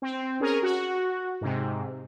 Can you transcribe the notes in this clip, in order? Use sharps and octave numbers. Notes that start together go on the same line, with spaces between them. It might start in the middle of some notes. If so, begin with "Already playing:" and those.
C4
C#4 G#4 A#4
F#4
G#2 C3